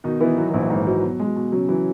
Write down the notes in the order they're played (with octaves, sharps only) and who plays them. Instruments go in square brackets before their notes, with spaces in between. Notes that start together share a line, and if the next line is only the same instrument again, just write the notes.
[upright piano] B2 [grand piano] D#3 D#4
[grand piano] E3 E4 [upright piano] B3
[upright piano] B2 [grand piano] F#3 F#4
[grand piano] F#4
[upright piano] A#1 [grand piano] E3 E4
[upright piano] G#2
F#3
B2
G#3
B2
[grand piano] C#3 C#4 [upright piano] F#3
[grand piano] E3 E4 [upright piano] F#3